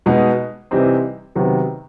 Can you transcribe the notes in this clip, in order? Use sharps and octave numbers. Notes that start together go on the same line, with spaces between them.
B2 G#3 B3 D#4
C3 E3 G3 C4 D#4
C3 D#3 F#3 B3